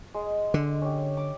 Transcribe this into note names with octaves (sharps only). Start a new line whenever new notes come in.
G#3 G#4
D3
C#4 G4
D6